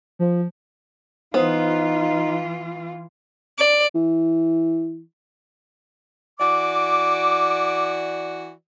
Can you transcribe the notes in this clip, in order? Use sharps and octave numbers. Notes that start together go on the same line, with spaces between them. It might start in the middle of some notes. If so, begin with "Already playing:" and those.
F3
E3 B3 D#4 F4 C5 D#6
D5
E3
E3 F#4 D5 D6